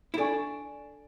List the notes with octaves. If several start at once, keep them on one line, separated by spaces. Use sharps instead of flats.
E4
D4 A4 D5 G#5 C#6